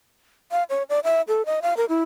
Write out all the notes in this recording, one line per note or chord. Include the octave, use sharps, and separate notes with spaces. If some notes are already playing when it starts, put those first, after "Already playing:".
F5
C#5
D5
E5
A4
D#5
F5
A#4
E4